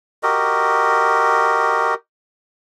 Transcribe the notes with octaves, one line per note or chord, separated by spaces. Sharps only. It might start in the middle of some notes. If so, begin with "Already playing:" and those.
F#4 G4 A#4 D#5